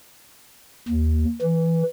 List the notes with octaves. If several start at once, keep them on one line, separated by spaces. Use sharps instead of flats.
D#2
E3